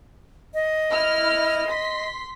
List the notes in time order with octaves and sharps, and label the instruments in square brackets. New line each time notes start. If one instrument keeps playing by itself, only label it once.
[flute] D#5
[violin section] E4 F6
C6 B6